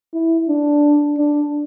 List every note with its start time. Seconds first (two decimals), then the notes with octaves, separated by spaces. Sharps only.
0.14 E4
0.49 D4
1.18 D4